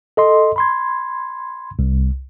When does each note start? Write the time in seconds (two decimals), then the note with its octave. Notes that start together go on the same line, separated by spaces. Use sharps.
0.17 A4 D#5 C6
0.56 B5 C6 G#6
1.79 C2